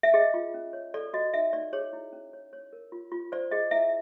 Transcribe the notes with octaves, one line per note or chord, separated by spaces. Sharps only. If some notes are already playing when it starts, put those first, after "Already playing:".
E5
G#4 D#5
F4
C#4
C#5
A4 D5
F#4 D#5
D#4 E5
D#4 D5
G#4 C#5
E4
C#4
C#5
C#5
A#4
F4
F4
C5 D5
G#4 D#5
E4 E5